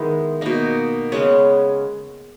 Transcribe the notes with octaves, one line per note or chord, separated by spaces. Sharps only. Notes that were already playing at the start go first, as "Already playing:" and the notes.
Already playing: D#3 G#3 B3 E4
B2 A#3 D#4
C#3 G#3 B3 C#4